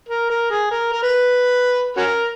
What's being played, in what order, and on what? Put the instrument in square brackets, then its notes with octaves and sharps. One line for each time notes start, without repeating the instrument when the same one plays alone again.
[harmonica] A#4
A#4
G#4
A#4
A#4
B4
C#4 F#4 A#4